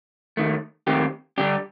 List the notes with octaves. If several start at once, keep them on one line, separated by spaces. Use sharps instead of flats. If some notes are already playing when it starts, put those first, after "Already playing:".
D#2 D#3 A3
D#2 D#3 A3 C4 G4
D3 G3 D4 G4